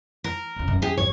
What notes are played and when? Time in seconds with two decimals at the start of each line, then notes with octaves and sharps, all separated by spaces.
0.24 A#4
0.56 F1 C#3
0.68 F#2 D#3
0.82 G4 G#4
0.98 G#1 F3 C#5